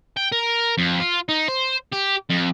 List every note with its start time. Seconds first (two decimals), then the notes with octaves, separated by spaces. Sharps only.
0.17 G5
0.32 A#4
0.78 F2
1.00 F4
1.29 D#4
1.48 C5
1.92 G4
2.30 F2